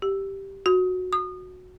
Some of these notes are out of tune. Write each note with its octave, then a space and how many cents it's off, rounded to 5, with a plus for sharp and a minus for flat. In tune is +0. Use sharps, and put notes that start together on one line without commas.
G4 -5
F#4 -15
D#6 -30